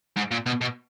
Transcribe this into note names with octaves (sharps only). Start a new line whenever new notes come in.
G#2
A#2
B2
B2